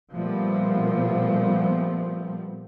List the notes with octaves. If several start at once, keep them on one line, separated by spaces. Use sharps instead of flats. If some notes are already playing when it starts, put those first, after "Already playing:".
A#2 F3 G3 A3 B3 C4